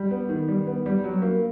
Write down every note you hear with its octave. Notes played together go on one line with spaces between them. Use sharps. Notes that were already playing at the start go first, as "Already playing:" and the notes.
Already playing: G3
B3
D#3
G3
B3
G3
F#3
A#3